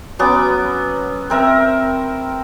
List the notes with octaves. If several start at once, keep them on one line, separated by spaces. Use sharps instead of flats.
F#3 B3 C#4 D6
C4 A#4 E5